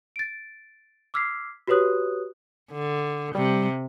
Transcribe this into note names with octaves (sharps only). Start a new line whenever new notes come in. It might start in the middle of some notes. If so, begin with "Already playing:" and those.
A6 D7
D6 E6 F6 G#6 B6 C7
F#4 G4 B4 C#5 D#6 F#6
D3
C3 G3